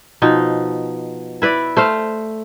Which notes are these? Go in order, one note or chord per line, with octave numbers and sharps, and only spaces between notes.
B2 F3 D#4
E4 B4 D5
A3 C5 F5